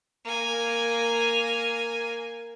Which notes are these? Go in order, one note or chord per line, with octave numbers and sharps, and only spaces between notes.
A#3 G#5